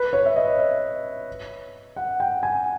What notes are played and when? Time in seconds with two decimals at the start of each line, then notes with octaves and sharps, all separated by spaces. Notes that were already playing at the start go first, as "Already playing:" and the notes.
Already playing: B4
0.13 C#5
0.26 E5
0.36 D#5
0.59 E5
1.96 F#5
2.20 G5
2.43 G#5